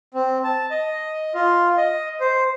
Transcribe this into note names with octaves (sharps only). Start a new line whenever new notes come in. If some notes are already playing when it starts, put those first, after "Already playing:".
C4
A5
D#5
F4
D#5
C5